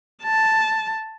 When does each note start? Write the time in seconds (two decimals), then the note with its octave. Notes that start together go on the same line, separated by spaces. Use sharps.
0.23 A5